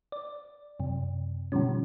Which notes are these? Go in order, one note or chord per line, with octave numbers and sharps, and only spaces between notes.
D5
F#2 C3
B2 D3 D#3 F3 G3 C#4